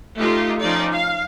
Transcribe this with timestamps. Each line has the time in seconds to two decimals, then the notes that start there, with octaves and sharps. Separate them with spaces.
0.18 A3 D#4 F4 G4
0.61 F3 C#4 D#4 D5
0.92 F5